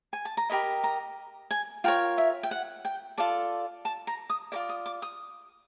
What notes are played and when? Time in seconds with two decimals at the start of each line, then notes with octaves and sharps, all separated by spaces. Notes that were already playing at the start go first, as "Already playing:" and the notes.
0.13 G#5
0.25 A5
0.37 A#5
0.50 G4 A#4 D#5 B5
0.84 A#5
1.51 G#5
1.84 F4 A#4 C#5 G5
2.18 E5
2.43 G5
2.51 F#5
2.85 G5
3.18 F4 A4 D5 A5
3.85 A5
4.07 A#5
4.30 D#6
4.52 F4 A#4 D5 D6
4.69 D#6
4.86 D6
5.02 D#6